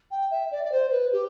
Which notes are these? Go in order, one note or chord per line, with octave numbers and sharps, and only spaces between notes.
G5
E5
D5
D5
C5
B4
G4